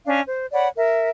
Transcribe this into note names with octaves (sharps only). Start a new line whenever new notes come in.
C#4 D4 F5
C5
C#5 D5 F#5 B5
A#4 E5